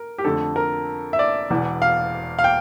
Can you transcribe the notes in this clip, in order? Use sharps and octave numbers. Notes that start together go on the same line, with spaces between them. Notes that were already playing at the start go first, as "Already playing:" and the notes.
Already playing: A#4
G4
F2 D3 A3 A4
A#4
E5
D5
E1 E2 E3
F5
F5
G5